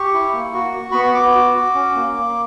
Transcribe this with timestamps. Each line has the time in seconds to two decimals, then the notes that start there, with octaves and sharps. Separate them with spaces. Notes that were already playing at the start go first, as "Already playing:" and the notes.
Already playing: G4 C#6
0.14 E4
0.33 A#3
0.54 F#4
0.73 F#4
0.92 B3 B5
1.03 C#6
1.14 B3 D6
1.35 F#4
1.54 F#4
1.75 C#4
1.95 A#3
2.15 A#3